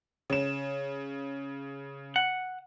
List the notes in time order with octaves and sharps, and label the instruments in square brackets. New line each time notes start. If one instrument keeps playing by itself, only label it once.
[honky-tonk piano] C#3 E7
[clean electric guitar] F#5